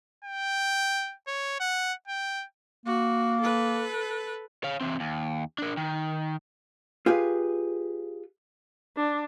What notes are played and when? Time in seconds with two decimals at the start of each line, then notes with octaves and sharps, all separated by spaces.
0.25 G5
1.27 C#5
1.60 F#5
2.08 G5
2.86 A#3 F#4
3.41 A4 B4
4.64 C#5 F5
4.81 E3 C4
5.00 D#2
5.58 D4 A#4
5.77 D#3
7.06 F4 G4 G#4 B4 F5
8.97 D4